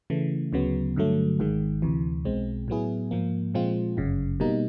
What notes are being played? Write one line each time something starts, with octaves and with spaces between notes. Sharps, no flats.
C#3 E3 A3
D2 C#3 F#3 B3
G2 D3 F#3 A3
G#1 G#2 D#3 G#3
D2 C3 E3
B1 B2 G#3 C4
A2 F#3 B3 E4 G#4
G#2 F3 A#3
A#2 F3 G#3 C4 F4
G1 F#2 C#3
B2 G3 A#3 D#4